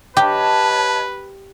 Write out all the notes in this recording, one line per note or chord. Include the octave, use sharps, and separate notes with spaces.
G4 B4 C#5 D#5 A5